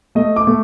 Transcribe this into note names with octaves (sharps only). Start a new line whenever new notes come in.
A3 D#5
D6
A3